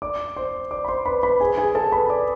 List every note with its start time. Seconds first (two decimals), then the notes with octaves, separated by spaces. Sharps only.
0.02 D5 D6
0.36 C5 C6
0.71 D5 D6
0.85 B5
0.88 C5 C6
1.06 B4 B5
1.23 B4 B5
1.41 G#4 G#5
1.58 G#4 G#5
1.75 A4 A5
1.92 B4 B5
2.10 D5 D6